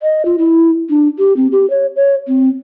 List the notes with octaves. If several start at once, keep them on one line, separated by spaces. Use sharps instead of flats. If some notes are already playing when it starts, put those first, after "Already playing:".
D#5
F4
E4
D4
G4
C4
G4
C#5
C#5
C4